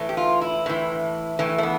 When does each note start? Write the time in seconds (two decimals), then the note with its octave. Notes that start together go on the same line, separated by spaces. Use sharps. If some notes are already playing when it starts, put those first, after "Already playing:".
Already playing: A2 E3
0.09 G4
0.17 F4
0.41 E4
0.66 A2 E3
1.39 A2 E3
1.58 A3
1.63 B3